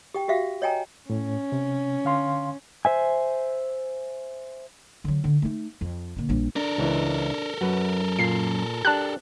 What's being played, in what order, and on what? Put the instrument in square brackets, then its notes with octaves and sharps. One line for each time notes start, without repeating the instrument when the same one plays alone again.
[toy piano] G4 G5
F#4 G4 E5 F5
C#5 D#5 G5 G#5 A#5
[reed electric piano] A2 [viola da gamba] C#4
[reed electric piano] C3
D3 F5 C6
[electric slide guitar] C5 E5 G#5
[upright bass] D3 F#3
D3
A3 D#4
F2
A#2 D3
A#1 G3
[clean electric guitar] D4 [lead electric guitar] A4 A#4
[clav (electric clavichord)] C#2 E3
[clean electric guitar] F#2 [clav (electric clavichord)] F#4 B4
[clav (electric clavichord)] A#2 [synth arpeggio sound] C7
[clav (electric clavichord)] D4 G4 [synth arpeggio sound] A5 F#6